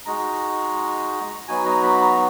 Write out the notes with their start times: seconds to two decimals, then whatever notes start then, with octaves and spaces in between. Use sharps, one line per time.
0.05 G#3 D#4 F#4 A#5
1.48 F#3 B3 D#4 F#4 G#5
1.66 A#5
1.83 B5
2.01 A#5